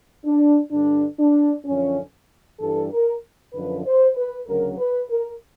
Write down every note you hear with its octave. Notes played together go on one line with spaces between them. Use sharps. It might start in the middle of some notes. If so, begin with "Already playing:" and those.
D4
G2 D3 G3 D4
D4
F#2 D3 F3 C#4
G2 E3 G3 A4
A#4
F#2 D3 F3 B4
C5
B4
D2 C#3 F#3 A#4
B4
A#4